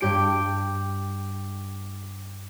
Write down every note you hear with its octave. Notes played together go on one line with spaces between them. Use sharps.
G2 G4 D7